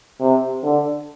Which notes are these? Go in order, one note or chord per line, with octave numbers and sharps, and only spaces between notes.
C3
D3